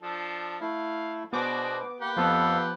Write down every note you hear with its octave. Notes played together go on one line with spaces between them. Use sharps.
F3 D4 A4
A3 E4 F5
B2 B3 D4 F#4 G#4 C5 D6
A#3 G4 B4 F#5
F2 F3 B3 A4 F5